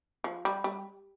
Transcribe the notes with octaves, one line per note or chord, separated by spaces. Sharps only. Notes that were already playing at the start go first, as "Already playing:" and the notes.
F3
G3
G3